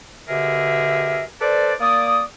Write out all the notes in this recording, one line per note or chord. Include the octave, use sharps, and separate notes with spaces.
B2 D3 G4 G#4 A#4 E5
A4 B4 C5 D5
A#3 D5 D#6